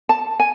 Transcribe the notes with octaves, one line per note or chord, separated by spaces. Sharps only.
A5
G#5